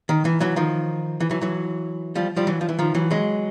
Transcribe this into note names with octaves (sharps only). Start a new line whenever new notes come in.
D#3
E3
E3 F#3
D#3 F3
E3
E3 F#3
E3 F#3
F3 G3
F3 G3
E3 F#3
F3
E3
D#3 F3
E3 F#3
F#3 G#3